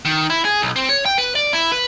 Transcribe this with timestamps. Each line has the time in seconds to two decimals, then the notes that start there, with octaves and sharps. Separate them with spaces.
0.05 D#3
0.30 E4
0.45 G#4
0.62 B1
0.76 C4
0.89 C#5
1.06 G5
1.18 B4
1.35 D5
1.53 E4
1.72 B4